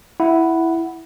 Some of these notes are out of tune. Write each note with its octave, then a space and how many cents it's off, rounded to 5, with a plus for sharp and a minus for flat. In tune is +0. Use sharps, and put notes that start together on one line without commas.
E4 +0 F#5 +0